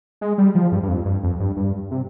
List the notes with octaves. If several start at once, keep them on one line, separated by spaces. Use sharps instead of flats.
G#3
G3
F3
G2
G2
F2
G2
F2
G2
G2
C3